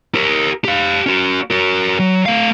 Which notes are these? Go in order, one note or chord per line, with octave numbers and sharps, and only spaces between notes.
G4 A#4
G4 F5
C#4 F#4
F#4 A#4
F#3
A3 F5